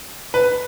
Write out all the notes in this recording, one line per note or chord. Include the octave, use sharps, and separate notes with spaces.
B4